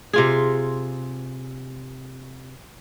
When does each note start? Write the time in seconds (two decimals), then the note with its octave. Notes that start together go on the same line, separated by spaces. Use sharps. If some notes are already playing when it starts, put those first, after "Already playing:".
0.13 C3 F4 G#4